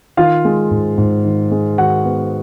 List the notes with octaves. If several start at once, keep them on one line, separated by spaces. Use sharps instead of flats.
D#3 F4 F5
G#3
G#2
G#2
D#3
G#3
D#3 F#4 F#5
B3